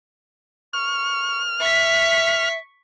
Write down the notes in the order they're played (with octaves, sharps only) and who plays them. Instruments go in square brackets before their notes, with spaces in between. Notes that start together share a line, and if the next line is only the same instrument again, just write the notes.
[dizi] C#6 [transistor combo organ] F6
[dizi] E5 [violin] C#6 B6